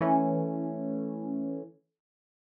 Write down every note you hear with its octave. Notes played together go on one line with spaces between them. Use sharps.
E3 A3 C#4